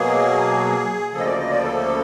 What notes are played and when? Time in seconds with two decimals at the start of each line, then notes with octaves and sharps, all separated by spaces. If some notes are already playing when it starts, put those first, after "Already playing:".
Already playing: B2 F#3 A#3 G#4
1.13 D2 C#3 F3 A#3 A4
1.20 D#5
1.26 D5
1.38 D#5
1.50 D5
1.63 A4